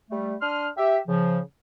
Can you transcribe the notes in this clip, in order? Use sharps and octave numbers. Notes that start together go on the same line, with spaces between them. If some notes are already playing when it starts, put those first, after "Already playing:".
G3 A3
D4 C6 D#6 F6
G4 E5
C#3 F3